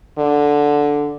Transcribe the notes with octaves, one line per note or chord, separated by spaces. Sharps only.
D3